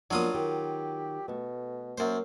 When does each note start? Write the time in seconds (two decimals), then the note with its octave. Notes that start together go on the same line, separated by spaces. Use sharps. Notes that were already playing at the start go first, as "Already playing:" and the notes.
0.11 F3 F#3 A#3 B3 D4 F4 D#6
0.34 D#3 G4
1.28 B2 A3
1.98 F#2 A#3 C5